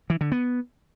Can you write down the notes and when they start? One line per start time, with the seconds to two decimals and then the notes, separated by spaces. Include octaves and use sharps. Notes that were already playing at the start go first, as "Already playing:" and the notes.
0.10 E3
0.21 D3
0.32 B3